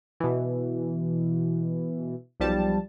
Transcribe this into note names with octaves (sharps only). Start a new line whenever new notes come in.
B2 E3
B1 F3 G3 A5